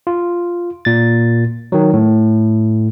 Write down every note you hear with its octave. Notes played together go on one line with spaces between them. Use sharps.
F4
A#2 A6
D#3 F#3
A2